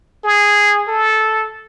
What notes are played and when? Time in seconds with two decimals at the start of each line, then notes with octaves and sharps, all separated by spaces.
0.24 G#4
0.88 A4